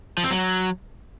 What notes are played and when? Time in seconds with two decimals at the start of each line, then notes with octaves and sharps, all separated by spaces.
0.17 F3
0.24 C4
0.30 F#3